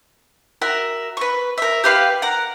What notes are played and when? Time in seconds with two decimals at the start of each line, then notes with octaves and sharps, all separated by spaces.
0.62 F#4 A#4 E5
1.17 B4 C#6
1.58 A#4 E5
1.84 G4 B4 F5
2.22 A#4 F#5